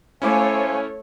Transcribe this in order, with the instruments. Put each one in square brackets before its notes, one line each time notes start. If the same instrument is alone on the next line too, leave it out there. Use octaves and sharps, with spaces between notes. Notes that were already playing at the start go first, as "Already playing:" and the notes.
[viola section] A3 C#5 [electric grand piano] C#4 E4 D6 [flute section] C5 F5 G#5